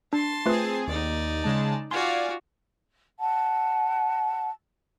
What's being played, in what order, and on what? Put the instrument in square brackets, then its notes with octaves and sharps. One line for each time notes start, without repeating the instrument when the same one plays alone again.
[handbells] D4 [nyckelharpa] A5 C6
[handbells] A3 F4 B4 [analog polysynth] C4 G#4
[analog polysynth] D#2 [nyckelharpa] D#4 D5
[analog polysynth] C#3 G#3 A5
[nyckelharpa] F4 F#4 [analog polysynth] D5 F5 G#5 [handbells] C6
[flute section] F#5 A5